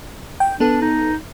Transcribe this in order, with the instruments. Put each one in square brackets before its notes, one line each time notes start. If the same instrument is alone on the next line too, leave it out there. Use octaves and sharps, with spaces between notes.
[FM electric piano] G5
[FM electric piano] B3 A4 [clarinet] D4
[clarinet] D#4